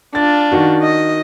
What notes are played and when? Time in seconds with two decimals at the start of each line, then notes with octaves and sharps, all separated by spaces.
0.15 D4 F4 A6
0.52 D#3 F#4
0.83 D#5